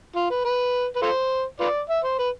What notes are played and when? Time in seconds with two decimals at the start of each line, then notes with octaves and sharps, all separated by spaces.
0.16 F4
0.30 B4
0.45 B4
0.96 B4
1.02 F4 A4 C5
1.60 F4 B4 D5
1.90 E5
2.04 C5
2.19 B4